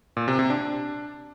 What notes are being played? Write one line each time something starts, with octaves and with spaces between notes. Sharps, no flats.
A#2
C3
C3
D4